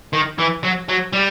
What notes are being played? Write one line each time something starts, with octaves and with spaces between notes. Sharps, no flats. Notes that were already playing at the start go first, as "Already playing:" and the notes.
D#3
E3
F#3
F#3
G3